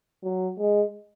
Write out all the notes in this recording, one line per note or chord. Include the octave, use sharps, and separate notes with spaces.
F#3
G#3